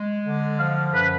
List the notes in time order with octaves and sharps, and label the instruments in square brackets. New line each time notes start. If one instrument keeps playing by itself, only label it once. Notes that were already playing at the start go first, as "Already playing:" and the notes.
Already playing: [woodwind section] G#3
D3
[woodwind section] F3 [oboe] F5
[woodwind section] F#2 [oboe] B4